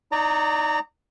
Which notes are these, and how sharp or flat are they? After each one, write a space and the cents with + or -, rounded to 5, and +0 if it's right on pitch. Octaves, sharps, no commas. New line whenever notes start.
D#4 +0 D5 -15 A#5 -30